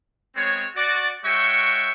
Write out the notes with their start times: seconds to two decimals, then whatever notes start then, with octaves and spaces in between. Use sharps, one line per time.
0.36 G#3 B3 C4 C#5
0.76 F#4 D5
1.24 G#3 F#4 C#5 E5 G5 C#6